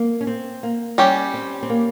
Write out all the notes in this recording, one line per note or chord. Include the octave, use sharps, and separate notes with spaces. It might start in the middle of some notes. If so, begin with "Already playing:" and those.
Already playing: A#3
C#4
C4
A#3
G3 C#4 G4
C4
C4
A#3